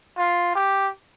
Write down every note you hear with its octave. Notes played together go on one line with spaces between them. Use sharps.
F4
G4